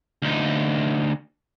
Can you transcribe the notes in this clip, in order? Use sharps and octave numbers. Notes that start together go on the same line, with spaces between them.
D2 D#4